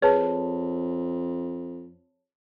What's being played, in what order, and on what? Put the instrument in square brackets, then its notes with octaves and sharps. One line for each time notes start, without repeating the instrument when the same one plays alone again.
[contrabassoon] F2 [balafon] G#4 B4 [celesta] C#5 A5